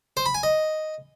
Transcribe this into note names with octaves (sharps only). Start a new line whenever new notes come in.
C5
B5
G#5
D#5